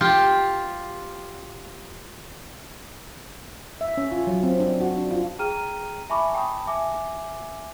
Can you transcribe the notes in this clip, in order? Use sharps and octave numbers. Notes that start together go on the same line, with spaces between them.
F4 G4
E5
C#4
F4
F#3
C4
D4
F#4
D4
F4
G#4 G5 A#5 F6 D#7
E5 G#5 A5 B5 C#6 D6
G5 A5 B5 D#6
E5 G#5 D6